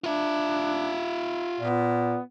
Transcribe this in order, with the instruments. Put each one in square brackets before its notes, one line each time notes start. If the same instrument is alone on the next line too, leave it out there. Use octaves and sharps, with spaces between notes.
[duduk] D4 [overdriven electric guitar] F4 E5
[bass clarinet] A#2 [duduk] B3